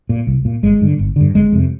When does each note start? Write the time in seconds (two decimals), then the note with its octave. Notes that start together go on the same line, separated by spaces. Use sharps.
0.09 A#2
0.27 C2
0.45 A#2
0.63 G1 G#3
0.81 G2 D3
0.99 G1
1.16 G2 D3
1.34 G1 G#3
1.52 F2 C3